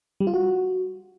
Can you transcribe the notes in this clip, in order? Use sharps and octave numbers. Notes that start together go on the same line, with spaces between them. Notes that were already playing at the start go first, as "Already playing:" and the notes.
G3
F4
F#4